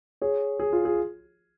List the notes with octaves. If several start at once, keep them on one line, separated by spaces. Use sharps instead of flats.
G#4 C#5
G#4
F4
G#4